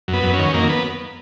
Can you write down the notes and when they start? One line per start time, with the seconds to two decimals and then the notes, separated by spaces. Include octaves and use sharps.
0.08 F#2
0.13 B3
0.23 F#2
0.33 C#4
0.39 D#3
0.54 F#2 A#3
0.69 B3